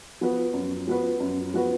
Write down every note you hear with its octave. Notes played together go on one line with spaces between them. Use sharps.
F3 B3 F#4 B4
F#2
F3 B3 F#4 B4
F#2
F3 B3 F#4 B4